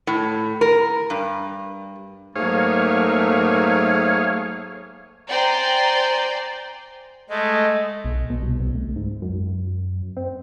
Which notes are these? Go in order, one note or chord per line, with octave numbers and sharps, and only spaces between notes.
A2
A#4
G2
G#2 F#3 A3 A#3 G#4 C#5 F5
C5 D5 G5 G#5 A#5 C6
G#3 A3 D#5
B1
B2
C2
C2
D2
G#2
F#2
C4